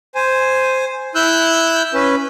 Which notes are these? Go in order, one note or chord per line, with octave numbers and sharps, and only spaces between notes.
C5 G#5
E4 E6 F#6 G6
C#4 B4